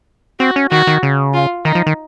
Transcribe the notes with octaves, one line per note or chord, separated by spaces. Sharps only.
C4 F#4
C#4
D#3 F#4
D#3
C#3
F4
D#3 D#4
F3
D#3